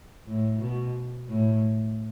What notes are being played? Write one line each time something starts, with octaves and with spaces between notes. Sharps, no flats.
A2
B2
A2